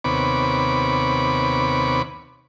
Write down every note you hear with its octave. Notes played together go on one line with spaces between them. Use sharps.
D#2 C3 B3 C#5 B5 D6